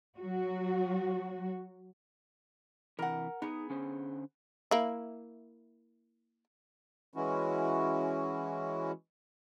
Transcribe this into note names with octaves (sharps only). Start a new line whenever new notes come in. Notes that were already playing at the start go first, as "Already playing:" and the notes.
F#3 F#4
C3 E3 A#4 F#5
B3 D#4 G#4
D3 C#4 C5
A#3 E4
E3 G#3 C#4 E4 F#4